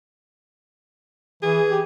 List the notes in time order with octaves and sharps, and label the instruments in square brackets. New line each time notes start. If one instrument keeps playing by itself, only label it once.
[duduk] E3 [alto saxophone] G#4
[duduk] G4